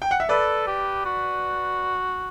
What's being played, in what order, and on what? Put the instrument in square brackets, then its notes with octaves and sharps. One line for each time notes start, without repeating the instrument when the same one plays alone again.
[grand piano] G5
F#5
E5
[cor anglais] A4 [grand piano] B4 D5
[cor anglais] G4
F#4